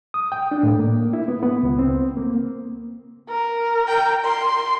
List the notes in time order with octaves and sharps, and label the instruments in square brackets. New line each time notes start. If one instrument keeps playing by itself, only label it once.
[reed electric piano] D#6
G5
D4
A2
A#3
E4
B3
B3
C#2
C4
A#3
[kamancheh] A#4
[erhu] G5
C6